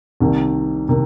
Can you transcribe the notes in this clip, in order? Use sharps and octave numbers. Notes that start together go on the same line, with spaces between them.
C2 C3 D#3 A#3
C3 D#3 A#3